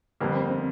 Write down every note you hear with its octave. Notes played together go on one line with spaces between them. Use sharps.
F2 D3 G3 A#3 B3
C4
C4